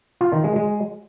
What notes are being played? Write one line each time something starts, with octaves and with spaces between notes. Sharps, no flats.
F4
D#3
G#3
G#3